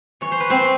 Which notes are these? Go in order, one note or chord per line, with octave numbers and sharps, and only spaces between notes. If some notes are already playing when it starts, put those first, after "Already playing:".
E3 C#5
C5
B4
C4 C5